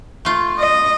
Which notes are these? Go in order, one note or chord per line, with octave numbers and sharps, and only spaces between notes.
A3 F4
D#5